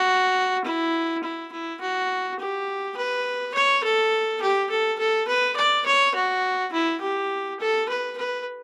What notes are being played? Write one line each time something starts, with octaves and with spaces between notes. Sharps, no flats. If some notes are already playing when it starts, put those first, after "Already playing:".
Already playing: F#4
E4
E4
E4
F#4
G4
B4
C#5
A4
G4
A4
A4
B4
D5
C#5
F#4
E4
G4
A4
B4
B4